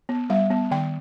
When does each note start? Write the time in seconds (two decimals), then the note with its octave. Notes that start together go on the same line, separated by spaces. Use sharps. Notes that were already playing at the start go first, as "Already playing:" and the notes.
0.09 B3
0.30 G3 E5
0.50 B3
0.71 D#3 G5